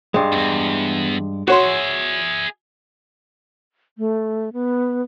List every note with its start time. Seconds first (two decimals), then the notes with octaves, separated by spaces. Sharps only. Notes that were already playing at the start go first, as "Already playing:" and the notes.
0.14 G2 G#3
0.33 E2 G#2
1.48 F#4 G#4 C#5 E5 C6
3.98 A3
4.53 B3